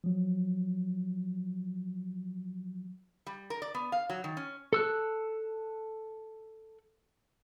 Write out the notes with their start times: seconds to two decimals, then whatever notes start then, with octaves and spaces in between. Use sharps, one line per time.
0.04 F3 F#3
3.26 G3
3.50 A#4
3.62 D5
3.75 B3
3.92 F5
4.10 F#3
4.24 D#3
4.37 C#4
4.73 A4 E6 F#6